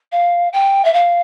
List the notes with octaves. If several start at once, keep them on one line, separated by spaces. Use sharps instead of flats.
F5
G5
E5
F5